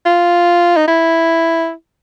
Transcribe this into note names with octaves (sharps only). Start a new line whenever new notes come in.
F4
D#4
E4